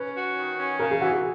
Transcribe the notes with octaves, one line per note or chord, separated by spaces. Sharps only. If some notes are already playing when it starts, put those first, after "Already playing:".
Already playing: C#4 B4
F#4
D#3
C#4
C#3 A#4
G#4
E3 F#4
G#4